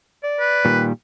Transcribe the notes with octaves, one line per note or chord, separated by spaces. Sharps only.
D5
B4
A#2 D#3 G3